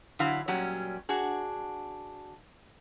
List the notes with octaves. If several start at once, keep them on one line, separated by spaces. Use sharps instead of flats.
D3 F#3 E4 F5
A#2 F#3 G3 C#4
D4 F#4 G#4